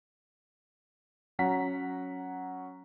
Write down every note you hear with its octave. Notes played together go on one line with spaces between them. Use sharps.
F#3 C#4 F#5 A#5 B6